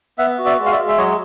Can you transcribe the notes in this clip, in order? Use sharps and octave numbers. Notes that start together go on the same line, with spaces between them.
B3 E5 F#5
F#4
D5 E5
G#3
F5
D5 E5
G#3
E5
F#3 C#5 D#5